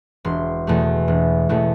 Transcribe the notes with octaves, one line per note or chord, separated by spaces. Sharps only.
E1 C6
E2 B2 A3
E1
E2 B2 A3